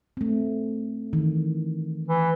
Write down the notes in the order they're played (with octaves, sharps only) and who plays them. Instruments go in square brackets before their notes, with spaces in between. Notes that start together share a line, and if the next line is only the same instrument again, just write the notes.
[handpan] A3 C4
D#3 E3
[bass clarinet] E3